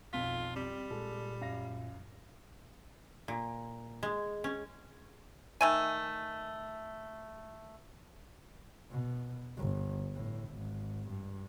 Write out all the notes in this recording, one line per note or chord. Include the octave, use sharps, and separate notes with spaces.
B1 F2 F4 F5 B6
G3 C4
A#2 G#3 A4
F#2 F5 A#6
A#2
G#3
C#4
D#3 A3 G#5
B2
G1
A2
G#1
G2